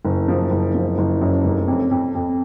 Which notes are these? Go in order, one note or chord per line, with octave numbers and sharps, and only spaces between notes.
F#1
F3
F#1
F3
F#1
F#2
F1
F2
F2
F2